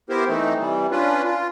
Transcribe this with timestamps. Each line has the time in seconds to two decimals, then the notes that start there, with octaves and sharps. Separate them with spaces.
0.10 B3 E4 G4 A#4 C5
0.29 E3 A3 C4 D#4
0.58 C3 E3 G3
0.91 C#4 D4 F4 B4
1.24 F4